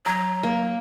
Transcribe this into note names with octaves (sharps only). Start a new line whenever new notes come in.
F#3 A#5
A#3